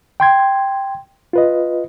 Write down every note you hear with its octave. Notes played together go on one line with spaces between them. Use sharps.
G5 C6 G#6
F4 B4 D#5